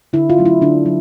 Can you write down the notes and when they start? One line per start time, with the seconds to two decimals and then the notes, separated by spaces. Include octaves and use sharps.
0.13 D3 E4
0.30 F4
0.38 F#3 A3 C#4
0.45 E4
0.61 D3 D4
0.86 F#3